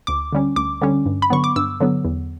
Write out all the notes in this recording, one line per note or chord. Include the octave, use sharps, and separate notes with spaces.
D2 D6
D3 G3 C#4
D2 D6
D3 G3 C#4
G2
B5
D3 F#3 B3 C#6
D6
G2 E6
D3 F#3 B3
E2